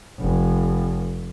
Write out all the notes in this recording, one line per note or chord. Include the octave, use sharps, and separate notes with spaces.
F1